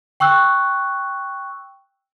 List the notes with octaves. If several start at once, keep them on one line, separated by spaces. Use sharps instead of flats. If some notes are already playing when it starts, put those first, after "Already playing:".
G5 C#6 E6 F#6